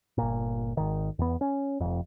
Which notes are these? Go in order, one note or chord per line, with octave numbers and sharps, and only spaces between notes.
G1 A#2
G#1 D#3
E2 B3
C#4
F1 F2